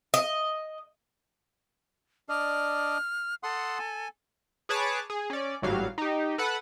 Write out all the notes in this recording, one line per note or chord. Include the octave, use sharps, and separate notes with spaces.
D#5
D4 D5 D#5 F6
A4 F#5 C6 D#6
G#5
G#4 B4 C#5 A5 D6
G#4
C#4 D5
G#1 A2 F#3 G3 F5
D#4 G4
A4 B4 F#5 B5